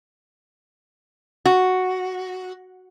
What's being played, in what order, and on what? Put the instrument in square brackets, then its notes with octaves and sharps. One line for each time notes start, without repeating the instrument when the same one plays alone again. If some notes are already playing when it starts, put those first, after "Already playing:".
[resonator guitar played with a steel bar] F#4